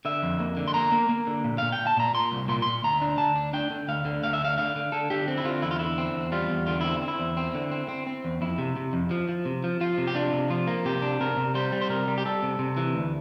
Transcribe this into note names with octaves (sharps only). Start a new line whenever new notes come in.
D3 E5
F2
A#3
D3
C6
A#3 A#5
A#3
A#3
D3
A#2
A#2 F5
G5
A#2
A5
A#2 A#5
A#2 C6
C2
A#2 C6
A#2 C6
D2 A#5
D4
D2 A5
D4
D4 G5
D3
D2 F5
D3
D2 F5
E5
D3 F5
D3 F5
D3
D3 A4
D3 G4
C4
E4
D3 F4
E2 E4
F4
D3 E4
C4
E2
G3 F4
E2
D3 F4
C4 E4
C4
E4
E2
C4
D3
C4
C4
C4
E2
F2 E4
C3
C3
F2
F3
F3
C3
F3
F3 F4
C3
G4
D4 F4
C3
F3 F4
A#3
C3 G4
D4
C3 A#4
C3
G3 C5
G3
C5
C3 A#4
G3
G4
G3 A4
C3
C3
E3
D2